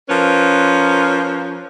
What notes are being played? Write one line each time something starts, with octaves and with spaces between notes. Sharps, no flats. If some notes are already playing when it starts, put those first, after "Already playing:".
F3 C#4 A#4 B4